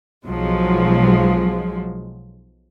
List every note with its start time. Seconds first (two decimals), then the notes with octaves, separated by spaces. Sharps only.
0.25 B1 F3 F#3 G#3